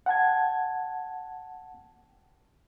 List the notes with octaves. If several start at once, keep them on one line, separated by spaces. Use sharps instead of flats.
F#5 G5 A5 G#6